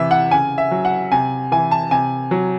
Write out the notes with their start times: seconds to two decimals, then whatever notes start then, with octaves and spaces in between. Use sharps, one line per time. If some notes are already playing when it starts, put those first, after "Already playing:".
Already playing: C3 E3 E5
0.11 F#5
0.31 C#3 G#5
0.58 E5
0.71 F#3
0.85 F#5
1.12 C3 G#5
1.52 E3 G#5
1.71 A5
1.91 C3 G#5
2.31 F#3